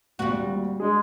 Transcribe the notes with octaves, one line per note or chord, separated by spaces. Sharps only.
G#1 D2 A#2 G3 F#4
G#3 D4 G#4